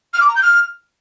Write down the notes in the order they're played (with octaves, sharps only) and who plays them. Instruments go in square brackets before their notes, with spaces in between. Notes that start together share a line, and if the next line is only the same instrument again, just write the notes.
[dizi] F6
D6
A#5
G6
F6